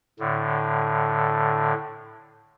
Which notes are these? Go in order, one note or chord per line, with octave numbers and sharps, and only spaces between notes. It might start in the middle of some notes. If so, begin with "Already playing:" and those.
A2 D3